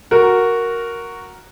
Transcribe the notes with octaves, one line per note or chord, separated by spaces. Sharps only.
F#4 A#4